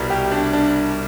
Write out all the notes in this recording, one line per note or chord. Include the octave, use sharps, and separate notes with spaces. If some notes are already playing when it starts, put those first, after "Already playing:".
Already playing: C2 B2 G3
G4
D4
D4